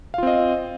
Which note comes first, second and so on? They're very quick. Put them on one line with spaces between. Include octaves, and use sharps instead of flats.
F5 F4 C4 D#5